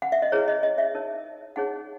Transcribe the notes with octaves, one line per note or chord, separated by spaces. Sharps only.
F#5
E5
D#5
E4 G#4 B4 C#5
D#5
D#5
E5
D#4 A#4 C#5
D#4 G#4 C#5 F#5